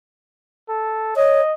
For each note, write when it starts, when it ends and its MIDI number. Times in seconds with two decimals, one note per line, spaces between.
0.69 1.14 69
1.16 1.41 73
1.16 1.54 75